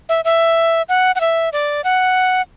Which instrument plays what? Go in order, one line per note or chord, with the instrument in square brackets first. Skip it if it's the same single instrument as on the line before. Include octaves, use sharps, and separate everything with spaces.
[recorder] E5
E5
F#5
F#5
E5
D5
F#5